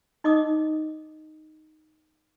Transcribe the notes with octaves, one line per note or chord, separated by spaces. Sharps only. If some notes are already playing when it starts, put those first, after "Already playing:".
D#4 D#5 D6 D#6